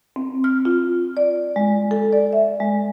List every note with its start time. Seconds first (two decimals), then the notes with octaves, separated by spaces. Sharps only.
0.16 C4
0.44 F6
0.65 F4
1.17 D5
1.56 G#3
1.91 A4
2.13 D5
2.33 E5
2.60 G#3